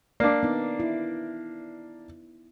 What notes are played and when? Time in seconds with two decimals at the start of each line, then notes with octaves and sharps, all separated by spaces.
0.20 A#3 D4 D5
0.43 B3 D#4
0.80 E4